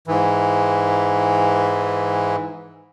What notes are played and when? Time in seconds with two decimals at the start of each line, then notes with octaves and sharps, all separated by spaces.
0.07 G#2 E3